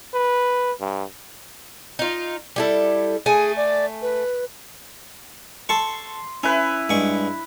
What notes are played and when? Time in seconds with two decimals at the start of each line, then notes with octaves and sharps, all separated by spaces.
0.14 B4
0.80 G2
1.99 D#4 F4
2.56 G3 E4 A4
3.26 A3 G#4 G#5
3.57 D5
4.02 B4
5.69 A4 A5 C6 C#6
6.43 C#4 E4 B4
6.89 G2 G#3 C#6